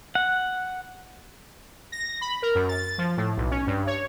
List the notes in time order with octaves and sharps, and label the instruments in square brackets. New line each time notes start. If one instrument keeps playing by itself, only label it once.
[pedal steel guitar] F#5
[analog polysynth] A#6
B5
A#4
F#2
A6
A6
F3
A2
B1
C#4
G2
C#5